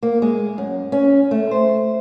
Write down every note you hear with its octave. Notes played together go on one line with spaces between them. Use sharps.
A#3
G#3
F#2
C#4
A3
C5